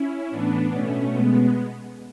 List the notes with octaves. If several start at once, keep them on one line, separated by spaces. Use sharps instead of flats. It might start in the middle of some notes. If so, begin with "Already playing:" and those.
Already playing: C#4 E4
A2 E3 B3 D4
B2 A3 C#4
B2 G#3 B3